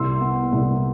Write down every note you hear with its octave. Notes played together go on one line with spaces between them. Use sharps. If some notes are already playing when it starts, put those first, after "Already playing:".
Already playing: C2 C6 E6
B3
C2